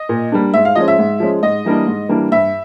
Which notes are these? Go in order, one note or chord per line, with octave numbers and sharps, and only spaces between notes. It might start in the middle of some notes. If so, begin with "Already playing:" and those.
Already playing: D#5
A#2
G3 A#3 D4
G#2 E5
F5
F3 G#3 C#4 D#5
E5
G#2
F3 G#3 C#4
G#2 D#5
E3 G3 A#3 D4
G#2
E3 G3 A#3 D4
G2 E5